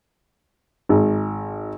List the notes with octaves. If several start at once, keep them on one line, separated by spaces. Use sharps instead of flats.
G#1